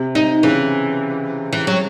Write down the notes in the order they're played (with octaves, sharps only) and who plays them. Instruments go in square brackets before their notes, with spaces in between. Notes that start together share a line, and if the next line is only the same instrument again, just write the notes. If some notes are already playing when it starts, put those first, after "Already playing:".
Already playing: [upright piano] C3
[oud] D#4
[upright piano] C#3 [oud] E3
[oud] E3
F#3